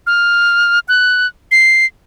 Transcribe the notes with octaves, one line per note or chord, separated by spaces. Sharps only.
F6
F#6
C7